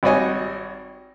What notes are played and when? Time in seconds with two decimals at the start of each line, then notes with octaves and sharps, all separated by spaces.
0.03 G#1 G3 F#4 C#5 D#5 G#5